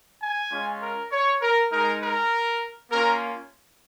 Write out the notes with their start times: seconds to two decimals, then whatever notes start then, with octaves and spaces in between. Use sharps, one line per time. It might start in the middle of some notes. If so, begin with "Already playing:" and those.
0.21 G#5
0.51 G#3 C#4 F4
0.81 A#4
1.11 C#5
1.41 A#4
1.71 G#3 D#4 A#4
2.02 A#4
2.91 A#3 C#4 F4 A#4